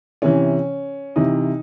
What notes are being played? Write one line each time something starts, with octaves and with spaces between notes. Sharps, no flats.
C3 E3 C#4
C3 E3 D#4